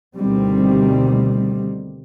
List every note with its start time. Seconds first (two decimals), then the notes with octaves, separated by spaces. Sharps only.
0.16 D2 B2 D#3 G3 C4